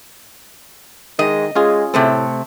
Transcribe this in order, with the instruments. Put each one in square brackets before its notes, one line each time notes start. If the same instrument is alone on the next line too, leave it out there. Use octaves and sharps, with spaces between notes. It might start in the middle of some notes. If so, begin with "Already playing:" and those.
[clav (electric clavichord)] D#3 [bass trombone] G#3 [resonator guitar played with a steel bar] D#5
[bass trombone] G#3 [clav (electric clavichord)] C#4 F4 G#4
[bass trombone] A2 [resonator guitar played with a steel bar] C3 A3 C4